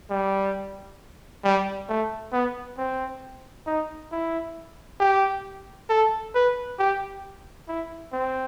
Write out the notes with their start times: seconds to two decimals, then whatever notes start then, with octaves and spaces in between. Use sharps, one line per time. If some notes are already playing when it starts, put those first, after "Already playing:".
0.11 G3
1.44 G3
1.89 A3
2.33 B3
2.78 C4
3.67 D#4
4.12 E4
5.00 G4
5.90 A4
6.35 B4
6.79 G4
7.68 E4
8.13 C4